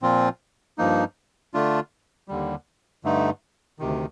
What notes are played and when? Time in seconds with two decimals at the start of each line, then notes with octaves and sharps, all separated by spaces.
0.02 A#2 F3 C4 F4
0.78 G2 F3 A#3 D#4
1.54 D3 A3 D4 F4
2.28 D#2 D3 G3
3.04 G2 D3 A3 D#4
3.79 D2 C3 D#3